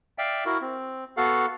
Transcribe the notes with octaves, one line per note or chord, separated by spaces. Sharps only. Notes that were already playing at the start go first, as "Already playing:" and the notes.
D5 E5 F5 G5
E4 F#4 A#4
C4
B3 F#4 A4 F5 F#5